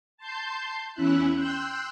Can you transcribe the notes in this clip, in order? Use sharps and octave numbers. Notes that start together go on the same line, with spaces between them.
A5 C6 G6
E2 C#4 E4 E5 F#6
G5 C6 E6 F#6 G6